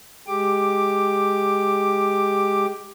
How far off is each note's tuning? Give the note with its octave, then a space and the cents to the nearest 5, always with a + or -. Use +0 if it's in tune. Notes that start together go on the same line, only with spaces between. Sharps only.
G#3 +0 G4 +0 D6 +10